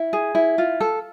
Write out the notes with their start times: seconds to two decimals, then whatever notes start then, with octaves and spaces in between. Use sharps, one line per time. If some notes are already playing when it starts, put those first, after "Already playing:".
Already playing: E4
0.13 G#4
0.35 E4
0.58 F4
0.81 A4